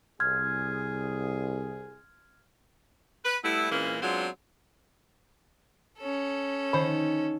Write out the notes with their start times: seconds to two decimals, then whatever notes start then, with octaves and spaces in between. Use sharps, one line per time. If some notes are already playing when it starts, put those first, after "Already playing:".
0.20 C2 G#4 C6 F6 G#6
3.25 B4
3.44 G3 A3 B3 E4
3.71 A#2 E3 G#3 A#3 C4 C#4
4.02 F#3 G#3 B3 C4 D4 F4
5.98 C#4 A4
6.73 D#3 C5 B5